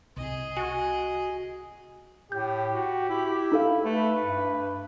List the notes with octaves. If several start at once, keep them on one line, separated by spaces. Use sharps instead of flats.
C2 C3 G#4 D#5
F#4 G#5
A2 G4 G6
F#4
E4
D#4 A4 F5
A3 B4
G2